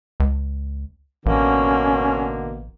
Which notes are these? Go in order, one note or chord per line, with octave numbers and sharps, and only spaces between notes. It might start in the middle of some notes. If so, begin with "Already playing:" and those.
C#2
A1 B2 D3 A#3 C#4